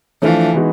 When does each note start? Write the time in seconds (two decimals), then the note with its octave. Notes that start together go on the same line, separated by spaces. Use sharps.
0.22 E3 F3 A3 D4 F4
0.53 E3 G#3 B3 D#4 F#4